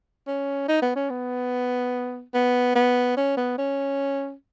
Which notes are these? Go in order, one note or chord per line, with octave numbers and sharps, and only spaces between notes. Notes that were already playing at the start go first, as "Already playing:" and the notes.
C#4
D#4
B3
C#4
B3
B3
B3
C#4
B3
C#4